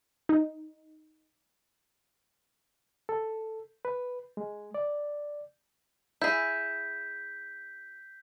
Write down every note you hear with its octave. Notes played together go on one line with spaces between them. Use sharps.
D#4
A4
B4
G#3
D5
E4 G#4 G6 B6